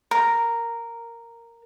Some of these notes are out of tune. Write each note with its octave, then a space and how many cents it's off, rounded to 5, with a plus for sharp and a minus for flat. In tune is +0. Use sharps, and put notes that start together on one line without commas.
A#4 -5